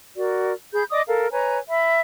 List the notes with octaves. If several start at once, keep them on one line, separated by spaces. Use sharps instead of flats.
F#4 A#4 D5
G#4 B5 G6
D5 D#5 D6 D#6
A4 A#4 F5
B4 C#5 G#5 A#5
E5 B5